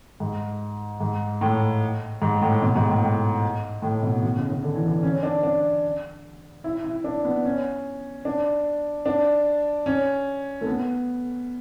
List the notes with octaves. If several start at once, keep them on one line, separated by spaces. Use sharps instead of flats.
G#2
G#2
A2
G#2
A2
B2
G#2
A2
A2
A2
B2
B2
C#3
C#3
D3
E3
D3
C#4
D4
D4
E4
E4
D4
B3
C#4
D4
D4
C#4
A3
B3